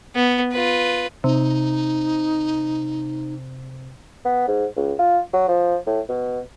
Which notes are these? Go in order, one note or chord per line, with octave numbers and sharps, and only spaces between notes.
B3
F4 B4
C3 D#4
B3
G#2
C#2
F4
F#3
F3
A2
B2